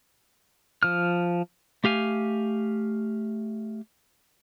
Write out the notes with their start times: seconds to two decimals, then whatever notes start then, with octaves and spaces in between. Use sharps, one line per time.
0.83 F3 F6
1.84 A3 G4 F5 G#5